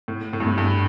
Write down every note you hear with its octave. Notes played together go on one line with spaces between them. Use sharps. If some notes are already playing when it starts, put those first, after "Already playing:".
A2
A2
G2
A2
G2